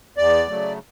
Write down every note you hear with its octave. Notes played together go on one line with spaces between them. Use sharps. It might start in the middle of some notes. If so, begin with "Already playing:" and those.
E2 D5
C#3 F#3 A3